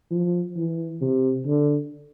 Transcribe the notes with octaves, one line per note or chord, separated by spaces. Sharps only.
F3
E3
C3
D3